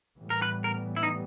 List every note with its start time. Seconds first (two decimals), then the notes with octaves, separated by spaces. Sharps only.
0.20 A2 E3 G3 B3
0.30 A#4
0.42 B4
0.64 A#4
0.96 E4
1.03 D#4